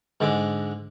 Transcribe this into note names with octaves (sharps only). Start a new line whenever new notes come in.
G#2 D3 G#3 D6